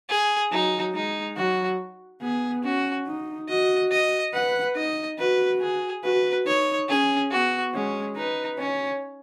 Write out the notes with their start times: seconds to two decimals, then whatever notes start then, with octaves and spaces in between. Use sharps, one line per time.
0.09 G#4
0.52 F#3 D#4
0.94 G#3 D#4
1.37 F#3 F#4
2.21 B3 G#4
2.64 C#4 F#4
3.07 D#4
3.49 F#4 D#5
3.92 D#5
4.33 B4 F#5
4.76 D#4 D#5
5.19 F#4 B4
5.61 G#4
6.04 F#4 B4
6.46 D#4 C#5
6.89 C#4 G#4
7.31 B3 F#4
7.74 G#3 C#4
8.16 D#4 B4
8.59 C#4 C#5